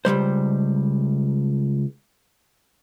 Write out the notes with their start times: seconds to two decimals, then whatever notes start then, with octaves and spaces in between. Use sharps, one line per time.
0.05 C#2 C3 G3 C5